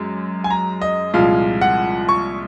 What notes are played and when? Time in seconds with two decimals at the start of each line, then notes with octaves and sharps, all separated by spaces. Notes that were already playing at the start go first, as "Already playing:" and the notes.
Already playing: F#2 G#3
0.44 G#5
0.50 A#5
0.82 D#5
1.13 C2 A#2 F3 G#3 F5
1.61 F#5
2.09 C#6